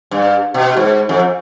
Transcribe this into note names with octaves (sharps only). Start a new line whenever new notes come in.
G2
B2
G#2
F2